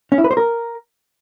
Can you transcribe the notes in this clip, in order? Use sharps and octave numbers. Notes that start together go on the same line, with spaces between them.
C#4
E4
B4
C5
A#4